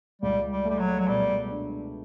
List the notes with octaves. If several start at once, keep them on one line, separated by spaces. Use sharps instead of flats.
C#2 G3
G3
G3 A3
F#3
F#3
B2 G3
D4